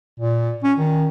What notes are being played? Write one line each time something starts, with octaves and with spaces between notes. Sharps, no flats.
A#2
C#4
D#3